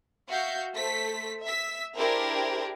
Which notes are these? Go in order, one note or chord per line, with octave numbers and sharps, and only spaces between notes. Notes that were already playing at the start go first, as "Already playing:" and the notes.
F#4 E5 F5 G6
A3 A4 C5 B6
E5 E6 B6
D4 E4 G4 G#4 A#4 C5